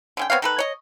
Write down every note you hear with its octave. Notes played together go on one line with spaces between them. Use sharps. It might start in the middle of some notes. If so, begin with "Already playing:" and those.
D3 C#4 G5
B3 C4 C#5 F5
D#3 A4 B4
C#5 D#5